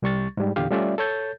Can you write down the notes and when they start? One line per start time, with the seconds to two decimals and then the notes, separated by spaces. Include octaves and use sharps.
0.02 C2 G3 C#6 A6
0.37 G#2 G3
0.56 E2 A#2 D3 G4 F5
0.71 G3 A3 C#4 F4 D5 E5
0.98 A4 C#5 G6 A6